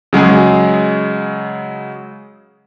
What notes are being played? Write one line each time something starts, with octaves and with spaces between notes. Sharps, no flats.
C#3 F#3 G#3 G#4